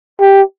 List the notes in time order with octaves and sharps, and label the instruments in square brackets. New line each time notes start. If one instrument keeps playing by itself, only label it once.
[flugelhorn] G4